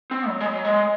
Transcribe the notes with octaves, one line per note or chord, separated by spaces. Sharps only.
C4
F#3
G#3
F#3
G#3